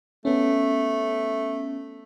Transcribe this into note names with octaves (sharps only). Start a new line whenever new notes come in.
A3 B3 C#4